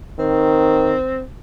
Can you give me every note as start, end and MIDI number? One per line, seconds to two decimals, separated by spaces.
0.19 0.95 51
0.19 1.21 60